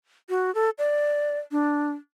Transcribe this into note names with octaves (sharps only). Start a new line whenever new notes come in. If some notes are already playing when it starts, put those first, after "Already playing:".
F#4
A4
D5
D4